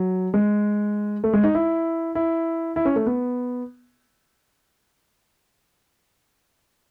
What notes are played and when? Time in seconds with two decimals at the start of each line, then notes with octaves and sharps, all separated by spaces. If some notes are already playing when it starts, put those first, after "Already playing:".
Already playing: F#3
0.34 G#3
1.24 A3
1.33 G#3
1.44 D#4
1.55 E4
2.15 E4
2.76 E4
2.85 C#4
2.96 A3
3.06 B3